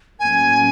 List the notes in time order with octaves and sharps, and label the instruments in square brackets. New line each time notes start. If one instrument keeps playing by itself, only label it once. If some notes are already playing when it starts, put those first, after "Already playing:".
[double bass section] A2 F#3 A#3 C#4 [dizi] G#5